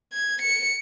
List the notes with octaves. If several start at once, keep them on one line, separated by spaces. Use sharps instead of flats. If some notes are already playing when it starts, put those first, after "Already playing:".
G#6
C#7